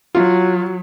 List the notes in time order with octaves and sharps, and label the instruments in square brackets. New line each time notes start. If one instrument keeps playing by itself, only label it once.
[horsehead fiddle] F#3 [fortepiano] F4